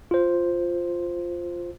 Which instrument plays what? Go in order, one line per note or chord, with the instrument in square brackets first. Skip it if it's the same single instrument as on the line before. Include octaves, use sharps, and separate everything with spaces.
[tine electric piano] F4 C5